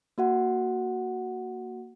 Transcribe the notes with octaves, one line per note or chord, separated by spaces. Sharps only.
A#3 F#4 F#5